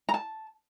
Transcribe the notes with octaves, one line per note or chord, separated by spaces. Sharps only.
A#5
A5